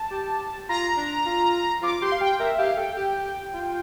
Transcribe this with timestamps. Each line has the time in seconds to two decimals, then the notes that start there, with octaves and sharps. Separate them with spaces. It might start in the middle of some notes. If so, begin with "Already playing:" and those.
Already playing: A5
0.11 G4
0.69 F4 A#5
0.97 D4
1.26 F4
1.82 F4 D6
2.02 G4 C6
2.12 F5
2.21 G4 G5
2.39 A#4 E5
2.58 G4 F5
2.77 A4 G5
2.97 G4
3.54 F4